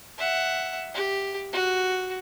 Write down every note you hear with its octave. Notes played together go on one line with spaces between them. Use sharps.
E5 F#5
G4
F#4